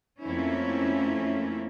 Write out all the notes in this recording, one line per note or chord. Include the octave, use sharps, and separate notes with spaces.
F2 A3 A#3 C4 C#4 E4